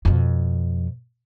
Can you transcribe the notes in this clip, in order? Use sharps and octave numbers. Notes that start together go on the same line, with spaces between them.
F2 B2